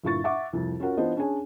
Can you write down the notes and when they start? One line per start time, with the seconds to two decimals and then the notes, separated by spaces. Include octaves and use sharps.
0.03 G1 A#2 E4 C#6 A6
0.24 E5 F#5 C#6 D6
0.53 C2 F2
0.80 C#4 F4 F#4 A#4 F#5
0.97 E3 B3 D4 F4 C5 D#5
1.16 C#4 D4 G#4 C#5 G#5